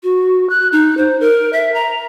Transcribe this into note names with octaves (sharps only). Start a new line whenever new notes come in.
F#4
F#6
D#4
C5
A#4
E5
A#5